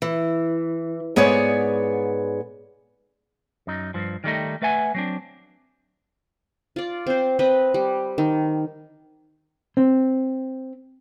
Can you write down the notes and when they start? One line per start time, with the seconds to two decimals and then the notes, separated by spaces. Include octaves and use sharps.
0.02 E3
1.16 G#2 B3 G#4 C#5 D5
3.67 F#2 D#4
3.94 G2 F3
4.24 D#3 G3 A3 D#4
4.62 A3 B4 E5 F#5 G#5
4.95 F#3 C4 D4
6.76 F4 D5
7.07 C4 C5
7.39 C4 B4 D#5 B5
7.74 G3
8.18 D#3
9.77 C4